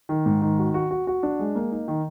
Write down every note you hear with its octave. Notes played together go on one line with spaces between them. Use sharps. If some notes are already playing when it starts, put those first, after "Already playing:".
D#3
G#2
D#3
F#4
F#4
F#4
F#4
D4
G#3
A#3
D#4
D#3